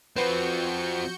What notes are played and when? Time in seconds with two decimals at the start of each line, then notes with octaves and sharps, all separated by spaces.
0.16 F3 C4 F#4 B4 G6 C#7